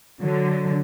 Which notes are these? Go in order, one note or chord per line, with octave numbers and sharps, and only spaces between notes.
D3 F#3